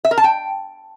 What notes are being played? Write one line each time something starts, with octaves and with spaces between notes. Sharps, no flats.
E5
A#4
A5
G5